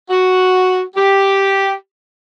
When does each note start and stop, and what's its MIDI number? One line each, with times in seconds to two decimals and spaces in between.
0.10 0.82 66
0.96 1.75 67